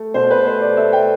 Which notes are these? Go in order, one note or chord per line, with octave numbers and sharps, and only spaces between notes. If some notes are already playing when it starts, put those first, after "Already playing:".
Already playing: A3
B2 C5
B4
A3 C5
D5
A3 E5
G5